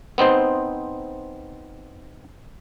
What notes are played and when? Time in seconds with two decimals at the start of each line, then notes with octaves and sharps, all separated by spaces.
0.18 B3 C4 D#4 C5